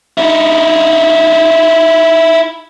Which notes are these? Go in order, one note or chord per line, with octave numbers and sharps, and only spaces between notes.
D#4 E4